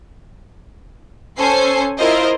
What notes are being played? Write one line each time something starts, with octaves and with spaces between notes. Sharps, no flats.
C#4 A4 C5 G#5 C7
E4 F4 A#4 C5 D#5